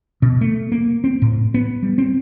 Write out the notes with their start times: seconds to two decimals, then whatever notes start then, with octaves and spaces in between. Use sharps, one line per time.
0.22 B2
0.41 A3
0.72 A#3
1.04 C4
1.22 A2
1.54 B3
1.83 G3
1.98 C4